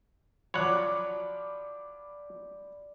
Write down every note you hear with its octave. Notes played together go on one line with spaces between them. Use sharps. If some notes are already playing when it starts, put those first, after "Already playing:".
F3 F#3 C#5 D5 F#5 B5 D6